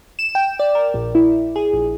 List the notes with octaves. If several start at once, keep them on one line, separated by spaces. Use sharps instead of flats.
E7
G5
D5
A#4
A#1
E4
G#4
A#1